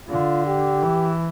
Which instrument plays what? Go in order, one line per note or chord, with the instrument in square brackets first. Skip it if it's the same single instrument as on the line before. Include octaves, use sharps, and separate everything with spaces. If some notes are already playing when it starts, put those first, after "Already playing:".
[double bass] D3 [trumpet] F4
[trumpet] G4
[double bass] E3